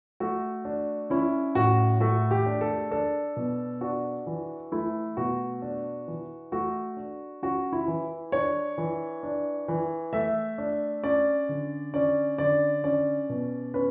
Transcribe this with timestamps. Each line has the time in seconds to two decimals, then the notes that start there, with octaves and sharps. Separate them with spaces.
0.20 A3 F#4
0.65 D4
1.10 C#4 E4
1.55 A2 F#4
2.00 A3 F#4
2.31 G4
2.46 D4
2.61 A4
2.91 D4 A4
3.36 B2
3.81 D4 F#4
4.27 E3
4.72 A3 E4
5.17 B2 F#4
5.62 D4
6.08 E3
6.52 A3 F#4
6.97 D4
7.43 C#4 F#4
7.73 E4
7.88 E3
8.32 D4 C#5
8.78 E3
9.23 D4
9.68 E3
10.13 A3 E5
10.58 D4
11.04 C#4 D5
11.49 D3
11.94 C#4 D5
12.38 D3 D5
12.84 C#4 D5
13.29 B2
13.74 C#4 B4